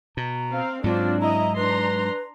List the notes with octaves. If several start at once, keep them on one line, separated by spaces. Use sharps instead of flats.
B2 A#5
C4 F5
G#2 F#3 C4 D4 F4
E4 D#5 A#5
D4 B4 A#5 C6